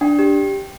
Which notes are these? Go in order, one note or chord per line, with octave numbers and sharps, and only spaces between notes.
D4 G5
G4